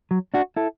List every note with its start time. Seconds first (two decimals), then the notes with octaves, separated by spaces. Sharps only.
0.11 F#3
0.34 D4 F#4
0.56 E4 A4